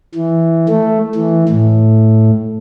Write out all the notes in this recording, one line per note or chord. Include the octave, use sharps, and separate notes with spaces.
E3
A3
E3
A2